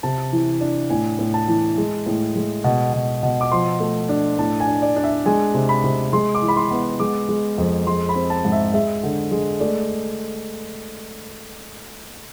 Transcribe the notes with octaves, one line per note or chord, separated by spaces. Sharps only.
C3 A5
E3
D4
A2 G#5
A2
A5
E3
G#3
A2
G#3
B2
B2
B2
D6
F3 C6
A3
D4
A2 A5
G#5
D4
D5
D4
E5
G#3 G#5
C3
B5
C3
G#3 C6
D6
E3
B5
C6
B3
G#3 D6
G#3
F2
G#3 C6
B5
C4
A5
G#2
E5
G#3 E5
D3
G#3
A3 D5